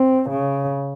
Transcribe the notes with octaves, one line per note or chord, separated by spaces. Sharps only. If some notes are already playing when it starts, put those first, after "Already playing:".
Already playing: C4
C#3